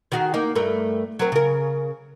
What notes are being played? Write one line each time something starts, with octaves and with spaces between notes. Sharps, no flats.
D#3 F#4 G#4
A#3 D#4
G2 A3 A#4
F#3 C4 A#4
C#3 A#4